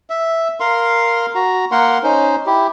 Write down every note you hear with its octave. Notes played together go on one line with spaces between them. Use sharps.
E5
A#4 F5 C6
F#4 A#5
A#3 A#4 F#5 C6
C#4 D#4 C5
E4 G4